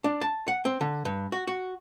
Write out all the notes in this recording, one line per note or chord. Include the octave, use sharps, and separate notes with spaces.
D4
A5
F#5
C4
D3
G2
F#4
F#4